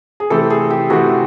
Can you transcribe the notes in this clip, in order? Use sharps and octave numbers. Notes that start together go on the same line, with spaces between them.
G#4
C3 E3 A3 C4 A4
G#4
G4
C3 E3 A3 C4 F#4